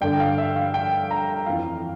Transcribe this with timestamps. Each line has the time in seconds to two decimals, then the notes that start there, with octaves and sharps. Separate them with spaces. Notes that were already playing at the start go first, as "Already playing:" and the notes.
0.01 G2 D3 G5
0.20 F5
0.38 E5
0.56 F5
0.74 G5
1.11 A#5
1.46 F2 E3 F5